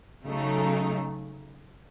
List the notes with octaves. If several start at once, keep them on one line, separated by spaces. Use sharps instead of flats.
C#3 F#3 A3 D#4